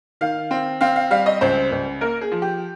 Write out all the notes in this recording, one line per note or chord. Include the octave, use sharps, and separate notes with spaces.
D#3 F5
C4
C4 F5
F5
G3 F5
D#5
C#2 C5
C#2
A#3 A#4
G#4
F3
G4